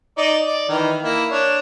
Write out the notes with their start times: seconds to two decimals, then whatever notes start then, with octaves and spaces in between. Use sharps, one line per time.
0.18 D#4 D5
0.45 D5
0.69 D#3 E3
1.03 A#3 E4
1.30 D4 C#5